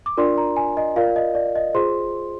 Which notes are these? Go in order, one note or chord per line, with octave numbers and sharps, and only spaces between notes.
D6
D4 F4 A#4 D5 C6
A#5
G#5
D#5
F4 A#4 D5 F5
D#5
D5
D#5
F4 G#4 C5 C6